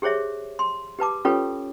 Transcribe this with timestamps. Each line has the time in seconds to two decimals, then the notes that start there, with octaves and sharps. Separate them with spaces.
0.02 G4 G#4 C5 C#5 E5
0.59 C6
0.99 G4 B4 A5 D6
1.25 C#4 F4 G4 A4 B4 C#5